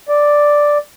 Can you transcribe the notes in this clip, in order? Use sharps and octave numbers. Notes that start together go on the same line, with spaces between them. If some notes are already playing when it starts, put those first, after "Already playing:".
D5